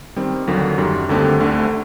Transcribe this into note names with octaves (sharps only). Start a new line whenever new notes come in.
D#3 G3 C4
D#2 D3 F#3 A#3 D4
F#2 D#3 G3
D#2 D3 A3 C4 G4
D2 D3 A3